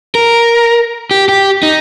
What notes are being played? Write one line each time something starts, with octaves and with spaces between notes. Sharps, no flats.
A#4
G4
G4
D#4